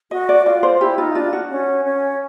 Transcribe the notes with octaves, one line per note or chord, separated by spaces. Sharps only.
F#4 D#5
D5
F4 D5
C5
E4 G4
D#4 F4
D4 F4
F#4
C#4
C#4